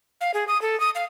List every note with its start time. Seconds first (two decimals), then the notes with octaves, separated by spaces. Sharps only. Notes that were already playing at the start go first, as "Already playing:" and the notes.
0.21 F5
0.34 G#4
0.48 D#6
0.62 A4
0.80 D#6
0.95 F5